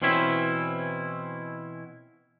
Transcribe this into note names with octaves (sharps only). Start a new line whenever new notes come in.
B2 E3 C4 C#4 E4